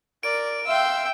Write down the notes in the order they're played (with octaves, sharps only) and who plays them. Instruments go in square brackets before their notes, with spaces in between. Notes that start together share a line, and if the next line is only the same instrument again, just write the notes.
[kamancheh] A#4 D5 [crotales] D7
[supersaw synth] E5 [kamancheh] F5 C6 [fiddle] G5 E6